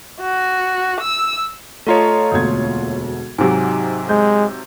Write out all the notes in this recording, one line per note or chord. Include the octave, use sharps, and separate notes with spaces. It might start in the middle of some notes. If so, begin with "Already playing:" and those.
F#4
E6
A3 F4 A4 C#5 D#5 A#5
E1 D2 A#3 G#6
G#2 C3 F#3 C4 D#4 G4 G#5
G#3 G6